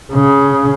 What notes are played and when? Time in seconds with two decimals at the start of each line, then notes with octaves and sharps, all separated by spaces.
0.13 C#3